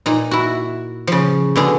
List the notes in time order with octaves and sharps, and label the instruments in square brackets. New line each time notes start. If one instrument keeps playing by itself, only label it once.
[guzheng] A#2 D#4
E4 F#4
C#3 F3
B2 D3 G#4